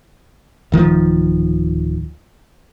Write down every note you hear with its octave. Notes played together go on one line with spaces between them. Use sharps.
D1 D#3 F3